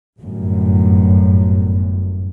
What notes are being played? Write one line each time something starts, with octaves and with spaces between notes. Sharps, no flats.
G1 F#2 A2